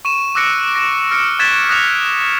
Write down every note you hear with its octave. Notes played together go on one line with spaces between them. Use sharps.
C#6 D#7 E7
D6 E6 F#6 A#6 C#7 D7
A#6
F6 A#6 C#7 D7
C#6 F#6 G#6 A6 B6 E7
D#6 F#6 A#6 C#7 F7